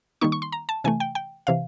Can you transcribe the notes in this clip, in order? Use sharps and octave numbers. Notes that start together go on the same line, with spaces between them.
D#3 G3 A#3 D#4 C#6
C#6
C6
A#5
A5
C3 E3 A3 G#5
G5
G5
C3 E3 F5